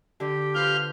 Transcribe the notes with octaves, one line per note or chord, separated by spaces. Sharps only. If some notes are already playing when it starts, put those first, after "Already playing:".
D3 G4
F4 B4 C5 F5 F6 G6